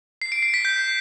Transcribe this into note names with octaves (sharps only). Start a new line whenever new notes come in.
C7
D7
C7
B6
G6